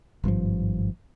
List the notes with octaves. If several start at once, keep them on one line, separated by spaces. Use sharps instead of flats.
G#1 G2 D#3 F3